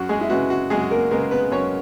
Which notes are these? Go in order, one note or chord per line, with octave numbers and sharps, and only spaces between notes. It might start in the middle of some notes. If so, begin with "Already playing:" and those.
Already playing: F#2 F#4
G#3 G#4
E4
C#3 G#3 B3 F#4
F#4
F#2 G#3 G#4
A#3 A#4
C#3 G#3 A#3 B3 A#4
B3 B4
F#2 C#4 C#5